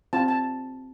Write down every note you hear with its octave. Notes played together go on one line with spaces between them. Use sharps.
C4 F4 A5
A5